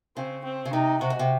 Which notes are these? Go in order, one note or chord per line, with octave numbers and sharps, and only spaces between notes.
C#3 C4
C4
C#3
C3 D#4
C3 F#4
G#2
C3